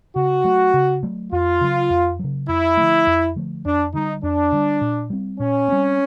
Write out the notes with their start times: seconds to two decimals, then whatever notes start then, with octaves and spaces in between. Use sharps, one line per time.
0.16 C#3 F#4
0.44 F#3 A3
0.74 C#3
1.03 F#3 A3
1.32 F2 F4
1.61 C#3 F#3
1.90 F2
2.19 C#3 F#3
2.48 F2 E4
2.77 D3 F3 A3
3.07 F2
3.36 D3 F3 A3
3.65 F2 D4
3.93 D3 G3 D#4
4.23 F2 D4
4.52 D3 G3
4.81 A#2
5.10 G3 C4
5.40 A#2 C#4
5.68 G3 C4